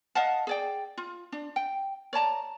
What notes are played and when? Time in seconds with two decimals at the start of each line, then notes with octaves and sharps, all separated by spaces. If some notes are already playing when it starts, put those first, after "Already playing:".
0.15 D#5 F5 F#5 A5
0.47 G#4 D5 G5
0.98 F4
1.32 D4
1.56 G5
2.13 C#5 D5 A5 A#5